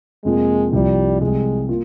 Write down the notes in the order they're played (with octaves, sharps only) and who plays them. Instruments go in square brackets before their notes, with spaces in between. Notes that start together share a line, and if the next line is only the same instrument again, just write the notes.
[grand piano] F2 C3 F3 A#3 F4 [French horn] G#3
[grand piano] C2 C3 F3 [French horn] G3
[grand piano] C2 C3 G3 [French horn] G#3
[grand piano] A#3 F4